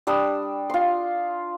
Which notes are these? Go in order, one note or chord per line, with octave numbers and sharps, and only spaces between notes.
G3 D4 D#6 E6
F4 C6